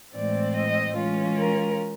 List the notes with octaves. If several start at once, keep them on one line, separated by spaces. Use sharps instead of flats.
A2 E3 G#3 C4 D5
D#5
E3 G#3 C#4 F4
A#4